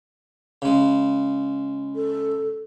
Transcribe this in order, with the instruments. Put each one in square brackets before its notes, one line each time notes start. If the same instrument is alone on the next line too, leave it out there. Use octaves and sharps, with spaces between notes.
[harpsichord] C#3 G#3
[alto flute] A4